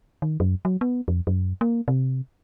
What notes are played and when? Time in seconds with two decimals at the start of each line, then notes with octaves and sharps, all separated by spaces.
0.22 D#3
0.40 F#2
0.65 F#3
0.81 B3
1.08 F2
1.27 F#2
1.61 A#3
1.88 C3